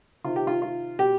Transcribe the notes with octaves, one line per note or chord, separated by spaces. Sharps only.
C3 D#3 F4
G4
F4
F4
B2 G4